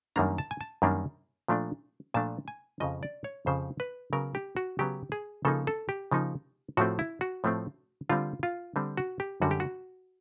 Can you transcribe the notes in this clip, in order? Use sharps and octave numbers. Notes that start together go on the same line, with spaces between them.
F#2 D#3 G3 A#3 D4 A#5
A5
G#5
A5
F#2 D#3 G3 A#3 D4
A#2 F3 A3 D4
A#2 F3 A3 D4 A5
G#5
F2 C#3 F3 D#5
D5
C#5
F2 C#3 F3 C5
B4
C#3 F#3 B3 A#4
G4
F#4
C#3 F#3 B3 G4
G#4
C#3 F3 A#3 D#4 A4
A4
G4
C#3 F3 A#3 D#4
A2 F3 A3 C4 F#4
E4
F#4
A2 F3 A3 C4
D3 G3 C4 F4
F4
D3 G3 C4
F#4
G4
F#2 D3 G3 F#4
G4
F#4